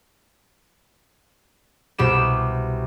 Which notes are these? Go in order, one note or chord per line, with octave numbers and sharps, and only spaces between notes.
C2 B2 G4 E7